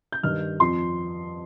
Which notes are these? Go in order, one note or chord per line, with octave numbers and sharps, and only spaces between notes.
G6
G2 D#3 G3 F6
F2 F3 C6